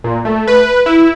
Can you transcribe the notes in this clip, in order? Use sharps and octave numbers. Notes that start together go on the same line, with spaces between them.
A#2
A3
B4
E4